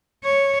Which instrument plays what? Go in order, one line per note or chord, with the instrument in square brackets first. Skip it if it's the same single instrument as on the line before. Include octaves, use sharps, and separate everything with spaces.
[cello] C#5